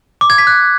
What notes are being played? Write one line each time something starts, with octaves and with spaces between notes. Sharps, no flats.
D6
G#6
B6
F#6